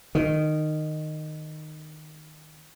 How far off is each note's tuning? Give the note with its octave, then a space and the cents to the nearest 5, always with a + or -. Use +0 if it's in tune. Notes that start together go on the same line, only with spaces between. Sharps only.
D#3 -15